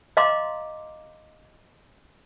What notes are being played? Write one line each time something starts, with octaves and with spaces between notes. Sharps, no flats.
D#5 F5 A#5 C6 D6